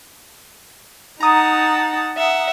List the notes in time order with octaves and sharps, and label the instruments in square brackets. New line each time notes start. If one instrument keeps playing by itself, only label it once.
[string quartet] D#4 F#5 A5 [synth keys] A#5 D#6
[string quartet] E5 F#5